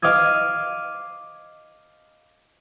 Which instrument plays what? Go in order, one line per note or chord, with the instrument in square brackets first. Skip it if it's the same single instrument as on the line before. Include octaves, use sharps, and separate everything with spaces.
[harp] D#5 F5 D6 D#6 G#6